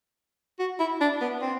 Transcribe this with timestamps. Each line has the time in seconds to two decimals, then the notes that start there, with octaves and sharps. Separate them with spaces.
0.59 F#4
0.80 E4
1.01 D4
1.21 B3
1.42 C4